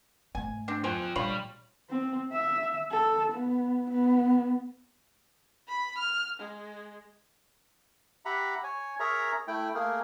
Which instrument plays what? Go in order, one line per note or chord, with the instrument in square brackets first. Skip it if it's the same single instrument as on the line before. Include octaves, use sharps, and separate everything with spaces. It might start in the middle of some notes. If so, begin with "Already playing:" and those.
[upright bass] G#2 A3 [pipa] G#5
[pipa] C4 D4
[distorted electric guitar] F4 G5 [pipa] C5 G#5
[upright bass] A#2 [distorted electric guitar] G3 B5 [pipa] D4 F4 C#5
[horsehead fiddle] C4
E5
A4
B3
B3
[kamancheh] B5
F6
G#3
[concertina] G4 E5 F#5 A#5 B5
C#5 G#5
G#4 A#4 C#5 E5 A#5
A3 E4 G5
A3 A#3 G#4 A#4